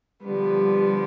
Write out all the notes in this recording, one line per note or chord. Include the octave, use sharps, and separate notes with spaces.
D3 F3 G3 B3